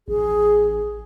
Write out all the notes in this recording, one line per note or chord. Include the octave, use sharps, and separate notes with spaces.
A1 G#4